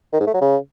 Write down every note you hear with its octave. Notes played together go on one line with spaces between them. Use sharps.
D#3
G#2
A3
F#3
C#3